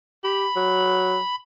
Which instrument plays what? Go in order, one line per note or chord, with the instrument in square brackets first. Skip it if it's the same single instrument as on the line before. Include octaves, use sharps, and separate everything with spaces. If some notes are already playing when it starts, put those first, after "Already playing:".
[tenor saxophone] G4 [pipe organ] B5
[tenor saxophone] F#3